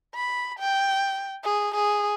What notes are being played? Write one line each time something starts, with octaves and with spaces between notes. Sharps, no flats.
B5
G5
G#4
G#4